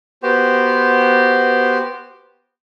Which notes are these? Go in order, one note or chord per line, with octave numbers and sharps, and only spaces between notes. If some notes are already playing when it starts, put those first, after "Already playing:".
B3 F#4 G4 C5